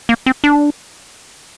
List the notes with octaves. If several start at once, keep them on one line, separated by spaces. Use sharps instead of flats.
A#3
C4
D4